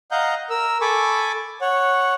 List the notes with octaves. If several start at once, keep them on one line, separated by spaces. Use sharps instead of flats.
D#5 F5 F#5 A#5 G6
A#4 E6
A4 G#5 B5 C#6 D6
C#5 F#5